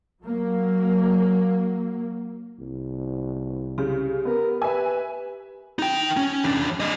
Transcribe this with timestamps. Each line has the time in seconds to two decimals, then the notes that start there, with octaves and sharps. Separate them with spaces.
0.22 F#3 A#3
2.59 C2
3.78 C#3 G4
4.25 B3 A#4
4.62 B4 E5 G#5
5.79 D#4 G5
6.17 C#4
6.44 E2 D4
6.80 G3 D#5